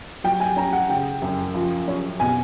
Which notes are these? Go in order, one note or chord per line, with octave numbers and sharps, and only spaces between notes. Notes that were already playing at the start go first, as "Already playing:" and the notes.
F#3 G5
G#5
C#4 A#5
F#5
C#3 G5
F#2
F3
C#4
B2 G#5